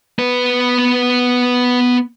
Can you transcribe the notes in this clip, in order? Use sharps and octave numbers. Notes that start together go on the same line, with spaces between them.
B3 B4